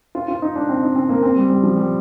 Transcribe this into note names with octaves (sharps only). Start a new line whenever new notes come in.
F4
F4
D#4
D4
C4
D#4
C4
A#3
C4
G3
G3
F3
G3